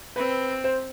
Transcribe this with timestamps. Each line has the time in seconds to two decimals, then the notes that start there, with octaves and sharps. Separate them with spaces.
0.16 C4 B4
0.64 C5